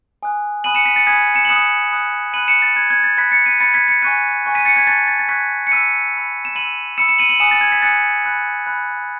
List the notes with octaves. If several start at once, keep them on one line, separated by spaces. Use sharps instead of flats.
G#5 D#6 F#6
G#5 B5 D#6 F#6 D#7 F#7
C#7 E7
B6 D#7
A6 C#7
G#5 B5 D#6 F#6 G#6 B6
C#7 E7
F#7
B5 D#6 F#6 C#7 E7
B5 D#6 F#6
B5 F#6 D#7 F#7
C#7 E7
A6
B5 F#6 G#6
G#6
A6
B5 F#6 G#6 B6
A6 C#7
B6 D#7
B5 F#6 A6 C#7
G#6 B6
A6 C#7
G#5 C#6 F#6 B6 D#7
G#5 C#6 F#6
B6 D#7
A6 C#7
G#6 B6
A5 C#6 F#6 A6
A6
A6
A5 C#6 F#6 G#6 B6
C#7
B5 E6 B6 D#7
B5 E6
E7
B5 E6 D#7 F#7
B5 E6 C#7 E7
C#7 E7
D#7 F#7
D#7 F#7
G#5 D#6 F#6 C#7 E7
A6
G#6
G#6 B6
G#5 D#6 F#6 A6 C#7
B5 F#6
B5 F#6